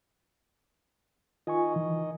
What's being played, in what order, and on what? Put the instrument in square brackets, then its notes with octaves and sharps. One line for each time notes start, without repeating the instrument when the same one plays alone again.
[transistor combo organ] D#3 D#5 [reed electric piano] F4 G#5 C#6
[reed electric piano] E3